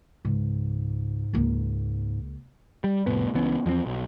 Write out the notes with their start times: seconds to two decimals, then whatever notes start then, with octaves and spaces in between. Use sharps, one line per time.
0.25 C#2 G#2
1.33 C#2 A#3
2.84 G3
3.06 F1 C2 A2 B3
3.34 C#2 E3 B3 C#4
3.66 E2 F3 A3 C4
3.86 B1